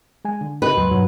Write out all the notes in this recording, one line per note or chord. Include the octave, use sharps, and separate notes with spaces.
G#3 G#5
D3
C#3 G4 B4 D#5 G5 B5
E2 G#2 F#3 C6
G2 B2 F#3